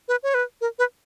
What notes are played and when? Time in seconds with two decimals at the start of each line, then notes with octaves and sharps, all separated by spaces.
0.08 B4
0.23 C#5
0.34 B4
0.61 A#4
0.79 B4